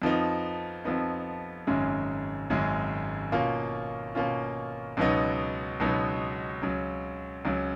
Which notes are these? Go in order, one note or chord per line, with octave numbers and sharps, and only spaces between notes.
F2 F3 B3 D#4
F2 F3 B3 D#4
G#1 F#2 C#3 G#3
G#1 F#2 C#3 G#3
B2 A#3 C#4 F4
B2 A#3 C#4 F4
C#2 B2 F#3 B3 D#4
C#2 B2 F#3 B3 D#4
C#2 C#3 F#3
C#2 C#3 F#3